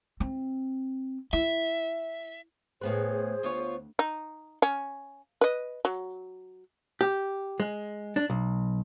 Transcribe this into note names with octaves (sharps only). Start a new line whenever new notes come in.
C4
E4 E5
A2 B3 G#4 B4 C5
D2 B3 F4 C#5
D#4
C#4
B4 D#5
F#3
G4
G#3
D4
B1